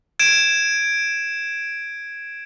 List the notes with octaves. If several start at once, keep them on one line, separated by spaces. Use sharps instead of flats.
G#6 D7 E7